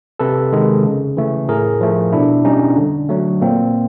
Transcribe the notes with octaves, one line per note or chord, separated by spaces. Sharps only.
C3 A4 B4
D#3 G#3
C#3
E3 A3
A2 G#4 A#4
F3 A3
B2 D4 E4
G3 C#4 D#4
D3
F#3 A3
A#2 A#3 C4